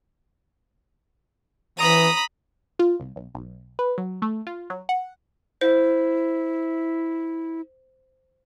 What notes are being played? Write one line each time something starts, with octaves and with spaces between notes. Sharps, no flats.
E3 A#5 B5 D#6
F4
C2
B1
B1
B4
F#3
A3
F4
F#3
F#5
E4 C5